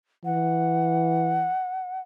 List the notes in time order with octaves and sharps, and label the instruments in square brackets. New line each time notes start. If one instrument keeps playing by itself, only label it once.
[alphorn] E3 [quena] F#5